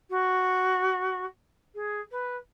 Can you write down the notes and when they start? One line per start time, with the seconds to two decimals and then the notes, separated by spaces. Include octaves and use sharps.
0.10 F#4
1.74 G#4
2.11 B4